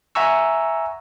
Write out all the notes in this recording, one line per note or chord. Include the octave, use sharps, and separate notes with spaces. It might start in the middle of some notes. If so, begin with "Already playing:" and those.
E5 F#5 G#5 A#5 C#6 E6